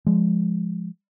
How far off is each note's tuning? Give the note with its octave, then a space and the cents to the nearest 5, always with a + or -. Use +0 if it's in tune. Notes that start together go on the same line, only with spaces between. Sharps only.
F3 +0 G#3 +0